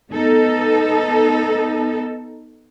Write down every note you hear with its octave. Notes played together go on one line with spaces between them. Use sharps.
B3 D#4 A4